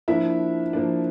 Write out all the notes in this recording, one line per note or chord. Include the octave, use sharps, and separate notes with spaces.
F3 A#3 D4 E4 E5
F3 A#3 D4